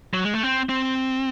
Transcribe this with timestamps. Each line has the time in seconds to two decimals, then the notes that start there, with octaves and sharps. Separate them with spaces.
0.14 F#3
0.24 G#3
0.34 A3
0.43 C4
0.69 C4